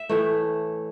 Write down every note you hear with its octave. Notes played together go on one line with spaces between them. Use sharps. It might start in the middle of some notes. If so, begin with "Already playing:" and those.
Already playing: E5
A2 E3 A3